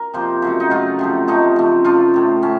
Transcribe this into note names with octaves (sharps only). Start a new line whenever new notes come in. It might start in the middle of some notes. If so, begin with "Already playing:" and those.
Already playing: A#4
C3 F3 A#3 C5
C#3 F#3 A3
D#4
C#3 F#3 A3 F4
C3 F3 A3
C3 F3 A3 D#4
C#3 F3 A3
C#3 F3 A3 F4
A2 A3
A2 C#4